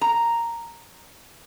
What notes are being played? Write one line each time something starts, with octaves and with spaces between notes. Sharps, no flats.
A#5